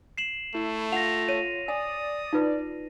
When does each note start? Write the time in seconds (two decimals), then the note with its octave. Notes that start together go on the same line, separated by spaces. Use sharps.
0.18 C7 E7 F#7
0.55 A3 E4
0.92 F4 F#5 A#6 F7
1.28 C#5 D#7
1.68 D5 G#5 D#6
2.33 D#4 F4 B4